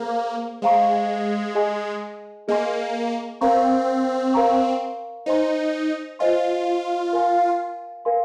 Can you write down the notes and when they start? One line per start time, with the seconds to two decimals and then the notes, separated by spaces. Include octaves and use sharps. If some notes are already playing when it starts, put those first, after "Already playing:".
Already playing: A#3 G#4 C5 F5
0.62 G#3 G#4 C5 F5 A#5 C#6
1.55 G#4 D#5 G#5 C6
2.48 A#3 G#4 D#5 G#5 C6
3.41 C4 A#4 F5 A#5 C#6
4.34 A#4 F5 A#5 C#6
5.26 D#4 C5 D#5 G#5 C6
6.19 F4 C5 D#5 G#5 C6
7.13 A#4 F5 G#5 C6
8.05 A#4 F5 G#5 C6